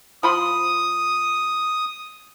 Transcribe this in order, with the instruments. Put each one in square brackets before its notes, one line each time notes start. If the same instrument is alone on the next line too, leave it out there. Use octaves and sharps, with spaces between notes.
[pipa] F3 B5 C6 [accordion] D#6